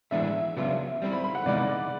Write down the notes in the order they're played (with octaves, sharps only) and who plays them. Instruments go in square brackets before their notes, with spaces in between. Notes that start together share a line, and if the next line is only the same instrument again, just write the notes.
[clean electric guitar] A2 E3 G#3 B3 D4 [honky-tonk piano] E5
[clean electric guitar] C#3 F#3 B3 D4 F4
G3 C4 E4
[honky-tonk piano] B5
B5
F#5
[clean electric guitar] C3 E3 G#3 B3 D#4 [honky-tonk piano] D5